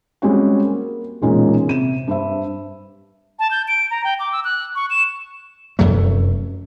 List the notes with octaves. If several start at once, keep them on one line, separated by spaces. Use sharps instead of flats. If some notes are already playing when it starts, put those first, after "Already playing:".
G3 G#3 C4 C#4 F#4
A#3
E1 A#2 G#3 C#4 D#4
C3 D#7 E7
G2 C5 E5
A5
G6
D7
A#5
G5
D6
E6
F#6
C#6
E7
F1 F#2 F#3 A3